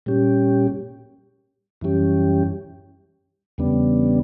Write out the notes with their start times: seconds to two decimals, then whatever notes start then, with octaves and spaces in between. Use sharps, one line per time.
0.06 A#2 G3 C#4 G4
1.81 F#2 E3 G3 C#4 G4
3.58 E2 C#3 G3 B3 D4